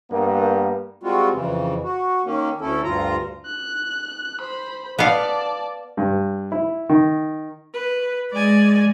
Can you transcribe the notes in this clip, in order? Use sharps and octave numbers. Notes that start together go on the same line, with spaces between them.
G2 A#3 B3 A#4
G3 G#3 C4 F4 F#4
F2 C#3 E3
F#4
D#3 A#3 C#4
D2 C#4 E4 A4
D2 G2 F4 A#5
F#6
C5 B5
B3 D5 F5 A5
G2
E4
D#3
B4
G#3 D5 G#5